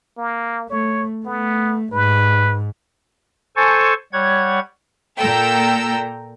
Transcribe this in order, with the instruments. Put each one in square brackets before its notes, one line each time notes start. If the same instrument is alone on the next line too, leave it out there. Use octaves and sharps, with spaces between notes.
[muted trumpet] A#3
[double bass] A3 [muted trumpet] C#5
[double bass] A3 [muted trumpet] B3
[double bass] G#2 [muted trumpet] B4
[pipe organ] A4 C5 G#5 A5 C#6
G3 C#5 F#5 G#6
[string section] A#2 A4 G5 A#5 E6